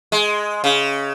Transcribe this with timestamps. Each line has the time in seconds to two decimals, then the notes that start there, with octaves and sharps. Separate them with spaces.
0.12 G#3
0.64 C#3